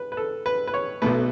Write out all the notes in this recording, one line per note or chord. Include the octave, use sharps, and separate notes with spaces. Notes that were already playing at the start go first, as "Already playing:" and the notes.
Already playing: B4
B4
A4
B4
B4
C#5
B1 B2 A3 B4